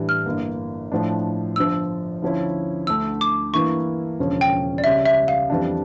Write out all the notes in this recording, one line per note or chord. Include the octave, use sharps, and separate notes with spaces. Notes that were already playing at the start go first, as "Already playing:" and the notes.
Already playing: A2 E3 G3 D4
F6
G1 G2 E3 A#3
A2 F3 A3 D4
G1 G2 F3 E6
D2 D3 F3 C#4 E4
D2 D3 A3 E6
D6
G2 E3 A#3 E4 C#6
E1 D2 C#3 F3 C#4
G5
D5
C#2 C#3 G3 C#4 E5
E5
F5
F2 E3 G3 D4